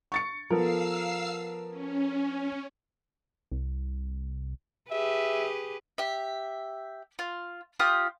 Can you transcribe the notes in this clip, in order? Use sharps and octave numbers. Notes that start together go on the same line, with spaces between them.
C#6 A6 C#7
F3 B3 A4 A#4 F5 E6 C7
C#4
C2
G4 G#4 B4 E5
G4 E5
F4
F4 G4 D#6